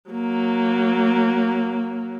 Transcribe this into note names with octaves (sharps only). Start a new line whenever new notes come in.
F#3 A#3